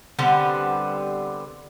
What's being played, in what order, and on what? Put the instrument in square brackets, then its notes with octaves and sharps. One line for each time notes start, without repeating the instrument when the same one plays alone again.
[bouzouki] D3 G3 B3 C4